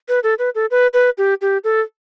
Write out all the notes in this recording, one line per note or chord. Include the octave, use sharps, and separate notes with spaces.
B4
A4
B4
A4
B4
B4
G4
G4
A4